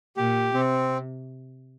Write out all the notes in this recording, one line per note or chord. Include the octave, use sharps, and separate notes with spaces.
A#2 G4
C3 C4